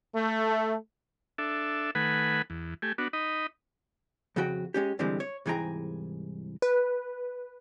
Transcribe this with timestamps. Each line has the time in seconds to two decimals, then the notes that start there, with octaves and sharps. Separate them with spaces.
0.14 A3
1.38 D4 A4 E5
1.95 D#3 A3 B4 F#5 G#5 B5
2.50 E2
2.82 A3 G4 G#5
2.98 B3 D4 F#4
3.13 D#4 D#5 B5
4.36 F2 C#3 F#4 G5
4.74 G#3 C#4 G4
4.99 G2 D3 E3 G3 G#3 C4
5.20 C#5
5.46 C2 G#2 E3 G#4 G5 A#5
6.62 B4